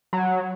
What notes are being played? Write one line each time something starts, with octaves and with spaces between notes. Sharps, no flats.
F#3